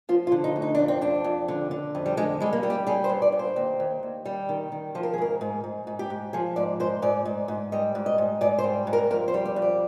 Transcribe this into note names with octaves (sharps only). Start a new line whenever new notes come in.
F3 F4
F4
D3
D#4
D2
D#4
F2 D4
C4
F2 D4
F2
D3
D3
F2
G3
D3 G#3
G3 G#3
A#3
G3
G4
G3 G#4
C5
G2
D5
G2
C5
D#2
D#2
D#2
G3
D#3
D#3
F3 C5
A#4
G#4
G#2 A#4
G#2
G#2
G#2
G4
G#2
F3 G#4
G#2 D5
G#2 C5
G#2 D5
G#2
G#2
G3 D#5
G#2
D#5
G#2
G#2 D5
C5
G3
G#2
A#4
F2 A#4
C5
G3
D5
F2
D5